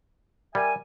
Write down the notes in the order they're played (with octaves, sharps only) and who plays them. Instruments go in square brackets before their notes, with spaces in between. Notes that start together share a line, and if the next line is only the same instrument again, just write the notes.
[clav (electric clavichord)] G3 [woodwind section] A#4 E5 G#5